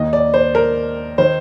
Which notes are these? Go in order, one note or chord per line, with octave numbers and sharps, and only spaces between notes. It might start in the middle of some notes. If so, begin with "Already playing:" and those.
Already playing: D#2 D#3 D#5
D5
C5
A#4
D#3 C5